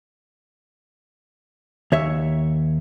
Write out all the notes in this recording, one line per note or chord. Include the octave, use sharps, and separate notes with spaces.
D#2 C#5 E5